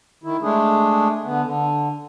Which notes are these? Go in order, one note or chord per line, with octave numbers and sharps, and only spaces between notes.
D#3 E4
G#3 A3 D4 G#4
D3 B3
D3